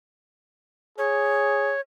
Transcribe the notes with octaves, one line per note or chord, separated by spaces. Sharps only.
G#4 C#5